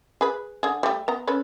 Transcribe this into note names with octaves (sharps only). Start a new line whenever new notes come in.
G#4 B4
D3 G#4
G3 A3
B3 A#5
C#4 A4 B4